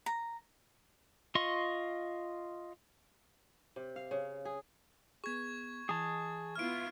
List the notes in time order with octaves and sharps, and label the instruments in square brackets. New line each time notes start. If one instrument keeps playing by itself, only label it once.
[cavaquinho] A#5
[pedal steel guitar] F4 D#5 C6 C#6
[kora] C3
F5
C#3
G#4
[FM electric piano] B3 G#4 [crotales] C#6 G#6
[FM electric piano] E3 D#5 [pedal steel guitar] G#4 A5
[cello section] B3 E4 F4 [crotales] F6 D7